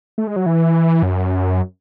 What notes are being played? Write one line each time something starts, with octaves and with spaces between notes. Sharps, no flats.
A3
G#3
F#3
E3
F#2